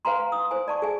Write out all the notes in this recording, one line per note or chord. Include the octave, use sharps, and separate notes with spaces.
B4 F5 F#5 G#5 A#5 C6
D#6
C5 G#5
D5 A5 C#6
G#4 G#5